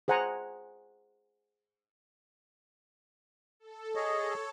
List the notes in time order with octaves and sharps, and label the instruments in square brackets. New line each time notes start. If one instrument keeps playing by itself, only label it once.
[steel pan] G#4 C5 F#5 G#5 A#5
[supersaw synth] A4
[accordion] G#4 D#5 [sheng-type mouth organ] C#5